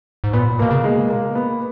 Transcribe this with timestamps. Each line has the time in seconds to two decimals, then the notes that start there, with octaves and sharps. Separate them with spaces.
0.24 G#2
0.33 A#2 B3
0.59 B2 A#3
0.71 C#3
0.84 G#3
1.09 A#3
1.35 B3